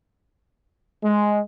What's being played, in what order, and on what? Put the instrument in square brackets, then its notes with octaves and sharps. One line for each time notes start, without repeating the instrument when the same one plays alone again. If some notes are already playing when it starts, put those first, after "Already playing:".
[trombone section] G#3